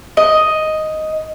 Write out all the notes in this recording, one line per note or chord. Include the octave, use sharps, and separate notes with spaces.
D#5